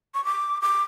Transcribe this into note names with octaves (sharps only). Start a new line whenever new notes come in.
C#6
D6
D6